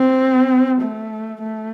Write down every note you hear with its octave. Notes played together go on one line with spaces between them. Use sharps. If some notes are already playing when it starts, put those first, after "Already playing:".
Already playing: C4
A3
A3